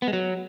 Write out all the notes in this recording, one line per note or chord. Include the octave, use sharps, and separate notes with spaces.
B3
G#3
F#3